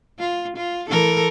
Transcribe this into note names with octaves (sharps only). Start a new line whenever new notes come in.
F4
F4
E3 A4 A#4